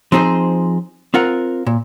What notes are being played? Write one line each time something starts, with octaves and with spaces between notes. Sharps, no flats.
F3 C4 D#4 G#4 C5
C4 F4 A#4 F#5
A#2